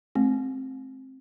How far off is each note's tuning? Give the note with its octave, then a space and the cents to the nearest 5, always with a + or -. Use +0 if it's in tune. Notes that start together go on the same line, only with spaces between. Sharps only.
A3 -40 C4 +15